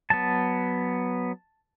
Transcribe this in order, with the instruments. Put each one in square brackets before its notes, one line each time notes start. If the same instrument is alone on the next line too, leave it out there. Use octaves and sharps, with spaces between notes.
[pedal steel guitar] F#3 B3 A5